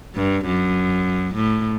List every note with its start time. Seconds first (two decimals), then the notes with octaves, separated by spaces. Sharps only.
0.15 G2
0.46 F#2
1.35 A2